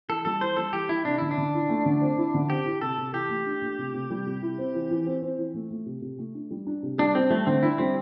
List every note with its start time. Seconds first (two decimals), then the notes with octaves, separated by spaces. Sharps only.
0.08 E3 A4
0.25 G3 A4
0.41 E3 C5
0.57 G3 A4
0.73 E3 G4
0.89 E3 E4
1.05 C3 D4
1.18 D3 E4
1.31 D4
1.38 D3
1.54 E4
1.69 A3
1.86 D3
2.01 C4
2.17 E4
2.34 D3
2.49 C4 G4
2.65 E4
2.81 C3 A4
2.98 C3
3.13 E3 G4
3.29 A3
3.46 D4
3.62 A3
3.79 C3
3.94 C3
4.10 G3
4.26 C3
4.42 E4
4.58 C4
4.75 E3
4.90 E3
5.06 C4
5.22 C4
5.38 E3
5.54 A3
5.71 A3
5.86 C3
6.02 C3
6.19 A3
6.35 D4
6.51 G3
6.67 D4
6.83 C3
6.98 G3 D4
7.15 G3 C4
7.30 G3 A3
7.47 D3 C4
7.63 D4 E4
7.78 G3 C4